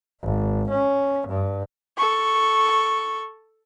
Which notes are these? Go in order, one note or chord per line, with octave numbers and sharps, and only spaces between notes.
G#1
C#4
G2
A4 C#6